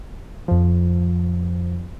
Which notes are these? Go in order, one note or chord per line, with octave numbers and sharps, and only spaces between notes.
F2 F3